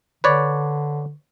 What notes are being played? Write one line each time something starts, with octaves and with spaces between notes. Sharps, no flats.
D3 B4 C#5 D5